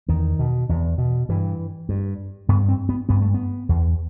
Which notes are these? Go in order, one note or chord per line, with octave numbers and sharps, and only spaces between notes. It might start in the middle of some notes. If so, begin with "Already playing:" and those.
E2 D#3
B2
E2
B2
G2 E3
G2
G2 B3
C4
B3
G2 B3
A3
B3
E2